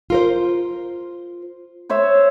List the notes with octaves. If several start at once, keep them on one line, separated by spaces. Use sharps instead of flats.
F4 A#4 C5
C5 C#5 E5